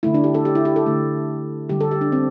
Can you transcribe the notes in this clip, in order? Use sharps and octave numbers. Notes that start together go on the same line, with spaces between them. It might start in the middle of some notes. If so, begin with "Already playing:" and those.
D3 A3 E4
D4
G4
A4
G4
E4
G4
A4
D3 A3
D3 G3 G4
A4
G4
D4
C4